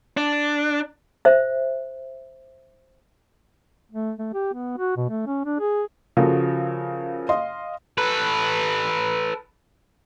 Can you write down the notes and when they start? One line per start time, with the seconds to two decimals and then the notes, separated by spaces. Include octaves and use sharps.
0.17 D4
1.25 C5 E5
3.92 A3
4.19 A3
4.34 G4
4.54 B3
4.78 F#4
4.97 B2
5.10 A3
5.27 C#4
5.45 D4
5.60 G#4
6.17 C#3 F3 F#4 A4 A#4
7.29 D#5 F5 C6
7.98 A4 B4